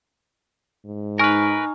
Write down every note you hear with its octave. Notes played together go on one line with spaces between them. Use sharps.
G#2
D#4 A#4 B4 G#5 C#6 F6